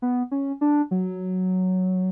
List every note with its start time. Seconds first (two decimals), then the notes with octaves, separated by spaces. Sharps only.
0.02 B3
0.31 C#4
0.61 D4
0.91 F#3